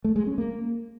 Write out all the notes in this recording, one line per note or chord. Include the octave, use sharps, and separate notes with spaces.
A3
G#3
C#4
A#3